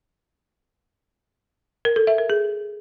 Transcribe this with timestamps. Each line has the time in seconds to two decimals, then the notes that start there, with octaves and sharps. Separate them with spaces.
1.85 A#4
1.96 A4
2.07 E5
2.18 A#4
2.30 G#4